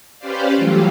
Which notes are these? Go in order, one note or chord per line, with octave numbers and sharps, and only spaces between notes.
C#4 G4 B4 C5 D5 F5
E3 F#3 G3 A3 F4 G4